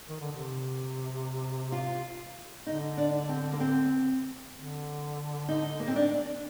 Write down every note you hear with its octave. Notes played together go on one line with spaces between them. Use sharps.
D#3
D3
C3
F4
D3 D#4
D4
C4
A#3
C4
D3
D#4
A#3
C4
D4